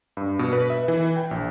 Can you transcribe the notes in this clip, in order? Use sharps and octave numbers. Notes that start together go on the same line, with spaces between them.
G2
B2
B4
E5
E3
G5
A#1